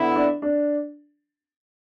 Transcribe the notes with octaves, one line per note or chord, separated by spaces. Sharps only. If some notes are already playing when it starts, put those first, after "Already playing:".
Already playing: D3 B3 E4
D4
D4